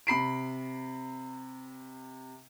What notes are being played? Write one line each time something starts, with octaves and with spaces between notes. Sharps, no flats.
C3 B5 C7 D7